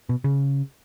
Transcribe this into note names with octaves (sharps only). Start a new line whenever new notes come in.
B2
C#3